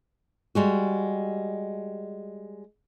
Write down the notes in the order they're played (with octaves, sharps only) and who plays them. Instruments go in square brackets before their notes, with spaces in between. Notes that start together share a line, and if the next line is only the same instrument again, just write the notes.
[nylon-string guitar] G3 G#3 F#4